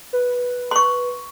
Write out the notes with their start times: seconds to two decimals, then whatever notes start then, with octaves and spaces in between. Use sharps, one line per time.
0.13 B4
0.71 C6 C#6